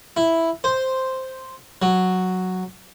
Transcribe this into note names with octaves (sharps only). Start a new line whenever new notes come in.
E4
C5
F#3